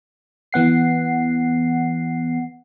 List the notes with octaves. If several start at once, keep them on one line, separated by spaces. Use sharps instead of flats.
E3 B3 F#5 C7